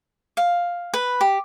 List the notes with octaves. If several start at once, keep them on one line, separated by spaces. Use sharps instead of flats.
F5
B4
G4